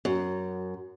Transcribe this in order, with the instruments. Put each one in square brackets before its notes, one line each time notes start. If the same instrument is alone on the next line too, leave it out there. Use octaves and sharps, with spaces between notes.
[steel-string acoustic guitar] F#2